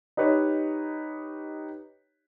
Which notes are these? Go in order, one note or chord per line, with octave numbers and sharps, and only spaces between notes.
D#4 G4 B4 C#5 D#5